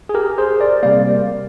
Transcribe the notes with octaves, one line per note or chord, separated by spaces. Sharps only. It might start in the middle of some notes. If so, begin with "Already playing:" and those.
G#4
G4 A#4
G#4 C5
A#4 D5
C3 G3 A#3 D5 F5